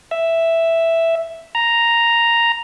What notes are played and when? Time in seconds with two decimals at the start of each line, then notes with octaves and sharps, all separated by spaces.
0.11 E5
1.55 A#5